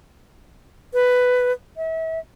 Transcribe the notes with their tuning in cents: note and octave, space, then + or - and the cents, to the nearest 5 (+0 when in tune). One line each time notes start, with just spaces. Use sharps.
B4 +10
E5 -35